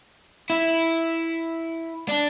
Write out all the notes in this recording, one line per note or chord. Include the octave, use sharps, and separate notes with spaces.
E4
D4